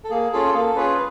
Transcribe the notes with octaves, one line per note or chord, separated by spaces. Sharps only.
A4
A#3 G#4
C#4 F4 G#4 A4
G#4
A#3 A4
C#4 F4 G#4 B4